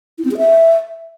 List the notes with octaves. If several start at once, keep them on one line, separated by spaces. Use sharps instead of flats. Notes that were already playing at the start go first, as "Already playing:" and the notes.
E4
C4
G#4
E5